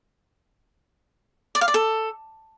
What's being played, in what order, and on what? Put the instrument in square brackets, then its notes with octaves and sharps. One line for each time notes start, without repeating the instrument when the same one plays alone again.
[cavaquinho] D5
F5
D5
A4